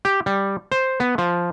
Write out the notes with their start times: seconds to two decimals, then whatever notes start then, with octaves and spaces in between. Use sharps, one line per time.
0.05 G4
0.26 G3
0.72 C5
1.00 B3
1.18 F3